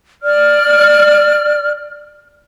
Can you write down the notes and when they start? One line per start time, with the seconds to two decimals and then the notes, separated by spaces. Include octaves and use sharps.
0.23 D5 F6